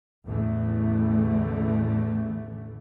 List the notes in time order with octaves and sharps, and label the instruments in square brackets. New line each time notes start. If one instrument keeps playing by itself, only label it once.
[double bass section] A1 E2 D3 E3 A3